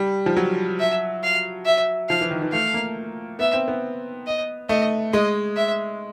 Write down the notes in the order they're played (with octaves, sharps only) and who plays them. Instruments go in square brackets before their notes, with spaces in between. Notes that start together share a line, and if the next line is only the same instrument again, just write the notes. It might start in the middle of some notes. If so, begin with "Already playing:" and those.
Already playing: [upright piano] G3
F3
F#3
[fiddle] E5
F5
E5
[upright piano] F3 [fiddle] F5
[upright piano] E3
D#3
E3
[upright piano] A3 [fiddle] F5
[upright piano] A#3
[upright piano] B3 [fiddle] E5
[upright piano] C4
B3
[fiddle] D#5
[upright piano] A3 [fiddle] D#5
[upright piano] G#3 [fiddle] D#5
[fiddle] E5